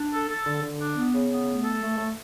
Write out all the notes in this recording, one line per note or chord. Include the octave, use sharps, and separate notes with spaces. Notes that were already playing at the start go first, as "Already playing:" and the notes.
Already playing: D4
A4
A4
D3
D3
D4
B3
C#3
B3
A3
A4
A3
A3